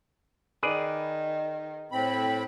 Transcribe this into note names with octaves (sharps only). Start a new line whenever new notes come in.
D#3 G#4 B4 D5
A2 C4 B5